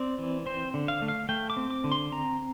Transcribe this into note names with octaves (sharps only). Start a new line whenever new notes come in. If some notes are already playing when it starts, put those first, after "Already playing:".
Already playing: C4 D5
E3
C4 C5
D3
F5
A3
F5
A3 G5
D6
C4
D6
D3
C6
C4 A#5